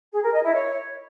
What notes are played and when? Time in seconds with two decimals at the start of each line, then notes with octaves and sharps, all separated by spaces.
0.13 G#4
0.23 A#4
0.33 D#5
0.44 E4
0.54 C#5